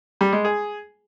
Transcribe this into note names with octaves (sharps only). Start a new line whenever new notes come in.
G3
G#3
G#4